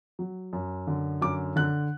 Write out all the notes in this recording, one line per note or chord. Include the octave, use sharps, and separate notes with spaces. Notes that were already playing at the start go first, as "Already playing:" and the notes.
F#3
F#2
D3
F#2 D6
D3 F#6